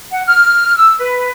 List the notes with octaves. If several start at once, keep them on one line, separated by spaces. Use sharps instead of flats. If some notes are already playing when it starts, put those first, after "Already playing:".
F#5
F6
E6
B4